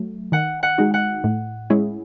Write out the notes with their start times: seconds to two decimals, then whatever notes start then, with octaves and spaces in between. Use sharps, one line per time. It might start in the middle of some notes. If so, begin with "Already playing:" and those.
Already playing: F#3 A3
0.32 D#3 F#5
0.63 F#5
0.78 G#3 D#4 F#4
0.94 F#5
1.24 A2
1.70 G#3 C#4 E4 G#4